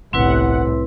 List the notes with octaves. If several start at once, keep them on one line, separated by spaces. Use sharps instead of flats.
G1 C2 A2 C4 E4 B4 F#5